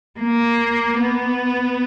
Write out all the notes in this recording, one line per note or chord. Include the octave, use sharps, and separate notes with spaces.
A#3
B3